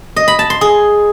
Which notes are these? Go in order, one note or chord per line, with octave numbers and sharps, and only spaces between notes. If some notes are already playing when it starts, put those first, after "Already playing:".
D#5
B5
A5
C6
G#4